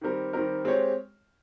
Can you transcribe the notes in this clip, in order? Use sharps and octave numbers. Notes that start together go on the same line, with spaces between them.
D#3 G3 C4 G4 A#4
D#3 G3 C4 G4 A#4
G#3 C4 G4 C#5